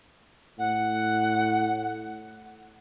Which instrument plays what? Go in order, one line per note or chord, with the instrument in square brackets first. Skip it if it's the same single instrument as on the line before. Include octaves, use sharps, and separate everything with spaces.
[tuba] A2 [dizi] F#5